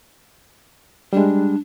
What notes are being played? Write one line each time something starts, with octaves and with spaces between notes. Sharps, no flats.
G3 G#3 D4